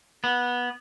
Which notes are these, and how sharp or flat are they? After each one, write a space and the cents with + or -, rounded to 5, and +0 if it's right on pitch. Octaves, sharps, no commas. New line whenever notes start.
B3 -15